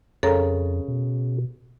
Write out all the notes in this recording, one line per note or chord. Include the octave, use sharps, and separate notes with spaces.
F2 C#3 A4 A#4 A#5
B2